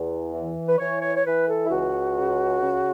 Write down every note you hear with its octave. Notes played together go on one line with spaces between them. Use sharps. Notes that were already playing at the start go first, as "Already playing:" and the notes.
Already playing: E2
E3
B4
E3 C#5
C#5
C#5
E3 B4
A4
E4
C#2 F#4
C#3
C#3